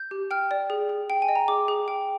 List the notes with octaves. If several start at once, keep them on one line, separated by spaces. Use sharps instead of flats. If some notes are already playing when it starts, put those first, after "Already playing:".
Already playing: G6
G4
G5 F6
D5
G#4
G#4
G5
G#5
D#5
A#5
G#4 D6
G#4
G5